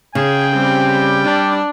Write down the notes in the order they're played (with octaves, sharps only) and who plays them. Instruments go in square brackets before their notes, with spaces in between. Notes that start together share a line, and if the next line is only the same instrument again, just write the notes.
[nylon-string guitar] C#3 [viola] G#4 [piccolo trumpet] G5
[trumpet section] G3 [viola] C4
[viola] D4